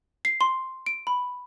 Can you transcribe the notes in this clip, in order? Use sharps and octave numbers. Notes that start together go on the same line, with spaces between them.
C7
C6
D7
B5